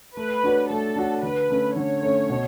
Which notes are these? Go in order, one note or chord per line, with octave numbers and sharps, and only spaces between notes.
A3 B4
D4 F#4 C#5
A3 A4
D4 F#4 C#5
D3 B4
A3 C#4
D3 C#5
A3 C#4
B2